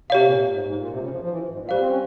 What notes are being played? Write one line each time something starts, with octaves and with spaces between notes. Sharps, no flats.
C3 G4 C#5 F5
A#2
G#2
G#2
A#2
C3
C#3
F3
F3
E3
G#2
A#2
G3 G4 C5 F5
C4
C#4